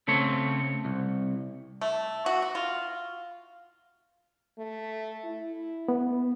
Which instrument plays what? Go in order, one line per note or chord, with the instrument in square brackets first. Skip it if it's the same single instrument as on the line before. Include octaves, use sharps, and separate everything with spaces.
[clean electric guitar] C#3 A3 C4 C#5
C2
[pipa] A3
F#4
F#4
F4
[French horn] A3
E4
[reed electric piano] B3